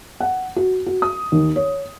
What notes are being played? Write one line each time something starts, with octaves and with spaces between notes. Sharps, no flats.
F#5
F#4
F#4
D#6
D#2
C#5